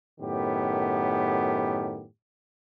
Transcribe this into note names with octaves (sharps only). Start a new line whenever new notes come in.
F#2 A2 D#3 B3 G4